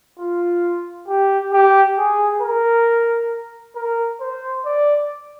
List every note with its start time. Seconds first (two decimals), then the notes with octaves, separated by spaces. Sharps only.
0.19 F4
1.08 G4
1.53 G4
1.98 G#4
2.42 A#4
3.76 A#4
4.21 C5
4.65 D5